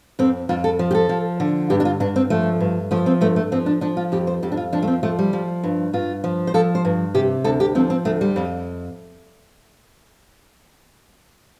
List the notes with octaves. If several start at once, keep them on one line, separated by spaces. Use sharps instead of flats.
F2 C4
F2 F4
A4
F3
G4
A4
F3
D3
G2 G4
D4
F4
G2 D4
C4
F3 A3
G2
F3 A3
C4
G2 A3
A3
F3 C4
D4
F3 D4
F4
F2 G4
C5
F2 G4
D4
F4
F3 D4
A3
C4
F3 A3
G3
F3
G2
G2 F4
F3
C5
F3 A4
C5
G2
C3 G4
D2 A4
G4
F3 C4
C4
D2 A3
G3
F2